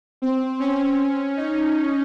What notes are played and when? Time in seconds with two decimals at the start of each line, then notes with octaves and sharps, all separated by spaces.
0.22 C4
0.60 C#4
1.37 D#4